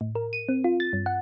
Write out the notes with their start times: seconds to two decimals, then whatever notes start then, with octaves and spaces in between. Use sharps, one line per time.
0.01 A2
0.15 A#4
0.33 D#7
0.49 C4
0.64 F4
0.80 A6
0.93 G2
1.06 F#5